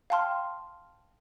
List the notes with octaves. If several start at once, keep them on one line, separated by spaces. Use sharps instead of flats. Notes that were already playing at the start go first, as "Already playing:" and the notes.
F5 G5 A5 C6 F6